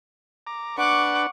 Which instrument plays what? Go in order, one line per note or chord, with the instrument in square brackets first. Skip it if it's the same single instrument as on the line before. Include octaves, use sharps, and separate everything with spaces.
[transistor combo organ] A#5 D6
[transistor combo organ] D4 B4 [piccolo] F#5 [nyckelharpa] C#6 D6